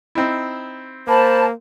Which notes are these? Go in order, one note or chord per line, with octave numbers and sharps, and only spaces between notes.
C4 D#4 E4
A#3 C5 A5 B5